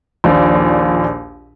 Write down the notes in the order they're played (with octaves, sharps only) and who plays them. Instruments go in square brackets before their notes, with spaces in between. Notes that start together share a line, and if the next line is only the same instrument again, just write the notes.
[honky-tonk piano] A#1 D#2 A#2 D5